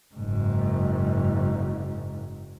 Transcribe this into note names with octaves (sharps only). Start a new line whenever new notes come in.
F#1 G#2